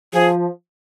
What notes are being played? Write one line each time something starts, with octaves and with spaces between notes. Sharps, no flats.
F3 G#4